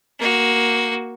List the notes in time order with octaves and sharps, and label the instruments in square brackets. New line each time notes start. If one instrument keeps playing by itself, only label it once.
[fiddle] A#3 F#4